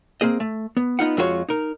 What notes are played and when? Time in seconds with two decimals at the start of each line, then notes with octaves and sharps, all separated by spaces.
0.21 A#3 C4 G#4 D#5
0.40 A3
0.77 B3
0.99 B3 D#4 F4 F#5
1.17 F2 G#3 F4 F#4 G#4 C#5
1.49 D#4 A#4